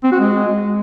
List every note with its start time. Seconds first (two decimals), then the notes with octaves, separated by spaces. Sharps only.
0.04 C4
0.12 F#4
0.20 G#3